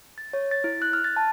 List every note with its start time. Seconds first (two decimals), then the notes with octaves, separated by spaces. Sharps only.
0.18 A6
0.33 C#5
0.51 A6
0.64 E4
0.82 F#6
0.93 F6
1.04 A6
1.17 A5